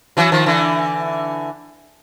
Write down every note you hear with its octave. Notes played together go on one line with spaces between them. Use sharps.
E3 F#3
D#3 F3
D3 E3